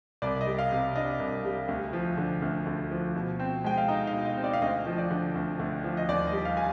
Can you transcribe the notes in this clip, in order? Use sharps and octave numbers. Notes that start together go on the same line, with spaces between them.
C2 D5
D#5
G3
F5
C3
D4 D#5
C2
G3
D2
F3
D3
D2
D2
F3
B2
C4
G#3 G5
F5
D#4 D#5
F5
B2
D#5
C4
D5
F5
D2 D#5
F3
D5
D3
D2
D2
F3
D#5
D#2 D5
D#5
G3
F5
G#5